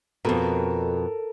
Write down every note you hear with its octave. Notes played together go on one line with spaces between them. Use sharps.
F2 B2 A4 A#4